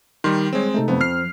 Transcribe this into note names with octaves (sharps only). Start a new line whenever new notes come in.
D#3 G3 C6
G3 G#3 C4 G#4 C#5
C3 A3 D#4 A4
F2 B3 C4
F3 F6 C7